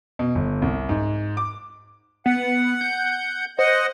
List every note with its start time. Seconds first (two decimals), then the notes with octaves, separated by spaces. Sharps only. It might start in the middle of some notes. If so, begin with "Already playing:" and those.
0.19 B2
0.35 G1
0.62 C2
0.89 G#2
1.37 D6
2.26 B3 F#5
2.81 G6
3.59 C5 D#5 F#5